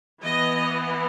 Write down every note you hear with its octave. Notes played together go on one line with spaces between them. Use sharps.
E3 B3 D#5